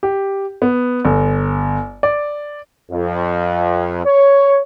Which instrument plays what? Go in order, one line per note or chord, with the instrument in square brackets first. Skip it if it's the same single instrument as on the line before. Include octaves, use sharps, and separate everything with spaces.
[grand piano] G4
B3
G1
D5
[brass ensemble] F2
C#5